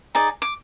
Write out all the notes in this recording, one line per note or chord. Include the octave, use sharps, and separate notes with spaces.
D#4 G#4 D5
D6